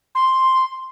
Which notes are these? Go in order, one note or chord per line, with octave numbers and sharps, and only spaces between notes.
C6